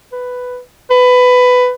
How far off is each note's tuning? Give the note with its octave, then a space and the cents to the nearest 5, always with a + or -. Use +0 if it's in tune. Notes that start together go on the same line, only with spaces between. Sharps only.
B4 +5
B4 +15